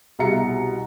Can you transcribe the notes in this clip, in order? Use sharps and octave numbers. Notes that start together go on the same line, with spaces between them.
C2 B2 G#4 E5 A#5 C#7